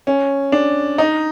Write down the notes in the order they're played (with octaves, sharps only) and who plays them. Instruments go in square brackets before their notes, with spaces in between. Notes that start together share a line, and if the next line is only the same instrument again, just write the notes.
[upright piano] C#4
D4
D#4